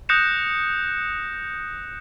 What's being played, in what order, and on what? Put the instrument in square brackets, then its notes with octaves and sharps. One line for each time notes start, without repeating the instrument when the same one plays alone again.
[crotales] D#6 F#6 G6 A#6 C#7 E7